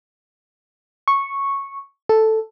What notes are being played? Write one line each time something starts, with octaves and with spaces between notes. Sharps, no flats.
C#6
A4